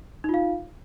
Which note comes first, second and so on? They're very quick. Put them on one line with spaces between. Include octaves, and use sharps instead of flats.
D#4 F4 F5